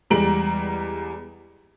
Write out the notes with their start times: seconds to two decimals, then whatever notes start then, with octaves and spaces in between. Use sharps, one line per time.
0.10 E2 G3 G#3 A#5 D7 F#7